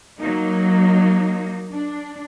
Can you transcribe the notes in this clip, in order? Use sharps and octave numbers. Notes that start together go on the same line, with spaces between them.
F#3 A#3 D#4
D4